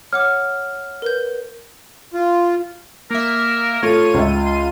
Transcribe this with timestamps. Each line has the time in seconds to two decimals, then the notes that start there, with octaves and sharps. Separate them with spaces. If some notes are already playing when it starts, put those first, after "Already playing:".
0.13 C#5 F#5 D6 F6
1.02 A#4 B4 G6
2.14 F4
3.11 A#3 A#4 E5
3.83 A3 F4 C#5 D#7
4.14 C#2 E5
4.45 C6